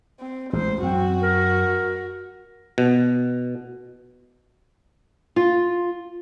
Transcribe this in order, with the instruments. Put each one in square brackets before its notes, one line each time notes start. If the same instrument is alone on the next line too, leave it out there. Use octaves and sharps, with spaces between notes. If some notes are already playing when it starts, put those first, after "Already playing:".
[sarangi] C4
[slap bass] A1 G#3 [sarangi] C5
[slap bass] F#2 [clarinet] C4 [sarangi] F#4
[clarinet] A#4
[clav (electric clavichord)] B2
[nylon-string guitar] F4